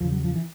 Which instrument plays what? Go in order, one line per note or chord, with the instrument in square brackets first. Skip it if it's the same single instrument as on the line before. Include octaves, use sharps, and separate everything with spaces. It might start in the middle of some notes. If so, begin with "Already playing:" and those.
[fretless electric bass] E2 C#3 F3
F#3
F3
E3